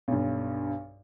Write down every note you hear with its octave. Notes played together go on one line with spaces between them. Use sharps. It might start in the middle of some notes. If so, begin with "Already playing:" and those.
B1 G2